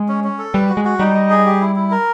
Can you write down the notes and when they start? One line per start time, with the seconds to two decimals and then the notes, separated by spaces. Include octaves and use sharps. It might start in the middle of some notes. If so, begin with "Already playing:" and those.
Already playing: G#3
0.08 C#4
0.24 C#4
0.39 A4
0.54 G3 B4
0.69 F#4
0.77 G#3
0.85 F#4
0.99 G3 D#4
1.15 D#5
1.30 G#4
1.46 G4
1.61 E4
1.76 E4
1.91 A#4